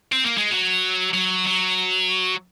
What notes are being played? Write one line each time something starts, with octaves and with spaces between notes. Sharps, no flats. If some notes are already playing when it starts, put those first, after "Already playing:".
C4
A#3
G#3
F#3
F#3
F#3